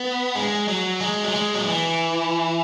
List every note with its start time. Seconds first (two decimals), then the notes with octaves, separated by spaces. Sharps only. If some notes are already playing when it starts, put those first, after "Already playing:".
Already playing: B3
0.36 G#3
0.68 F#3
1.00 G#3
1.24 F#3
1.34 G#3
1.55 F#3
1.66 E3